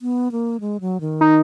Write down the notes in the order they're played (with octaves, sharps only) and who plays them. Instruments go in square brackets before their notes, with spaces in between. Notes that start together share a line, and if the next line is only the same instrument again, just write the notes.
[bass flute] B3
A#3
G#3
F#3
D#3
[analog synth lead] D#4